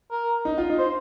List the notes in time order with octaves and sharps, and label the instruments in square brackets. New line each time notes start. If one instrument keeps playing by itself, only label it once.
[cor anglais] A#4
[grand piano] D#4
F4
D#4
[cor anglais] C5